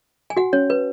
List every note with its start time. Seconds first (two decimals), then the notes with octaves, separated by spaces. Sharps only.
0.30 G#5
0.37 F#4 F#5
0.53 C#4 C#5
0.70 B4